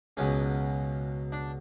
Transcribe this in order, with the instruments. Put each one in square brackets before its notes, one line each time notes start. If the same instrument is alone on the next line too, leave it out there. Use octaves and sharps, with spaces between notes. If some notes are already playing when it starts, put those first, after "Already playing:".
[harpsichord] C#2 B2 F#3 C#4
D4